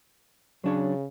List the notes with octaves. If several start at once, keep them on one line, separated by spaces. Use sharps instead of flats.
C#3 F#3 D4 C#5